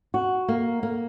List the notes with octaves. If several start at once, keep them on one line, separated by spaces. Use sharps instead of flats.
F#4
A#3
A#3